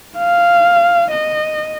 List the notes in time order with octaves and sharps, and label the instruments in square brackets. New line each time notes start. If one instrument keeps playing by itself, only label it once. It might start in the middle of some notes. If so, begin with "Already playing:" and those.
[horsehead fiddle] F5
D#5